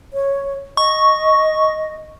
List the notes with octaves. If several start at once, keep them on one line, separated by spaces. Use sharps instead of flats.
C#5
D#5 C#6